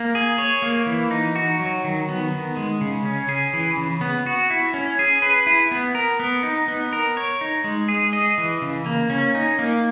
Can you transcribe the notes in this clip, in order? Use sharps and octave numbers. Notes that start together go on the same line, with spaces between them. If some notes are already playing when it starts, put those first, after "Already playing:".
Already playing: A#3
G#4
C#5
A#3
E3
D#4
F#4
F#3
D#3
B3
D#3
G#3
C#3
C#4
G#4
E3
C#3
B3
F#4
E4
C#4
G#4
B4
E4
B3
A#4
B3
D#4
B3
A#4
C#5
D#4
G#3
G#4
D#5
E3
C#3
A#3
C#4
D#4
A#3